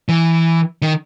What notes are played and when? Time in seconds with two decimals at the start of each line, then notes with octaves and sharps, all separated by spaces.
0.09 E3
0.82 D#3